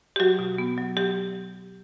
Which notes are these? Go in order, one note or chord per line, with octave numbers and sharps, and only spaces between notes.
G4
F#3 F#4
B2
B3
F#3
F#3 G4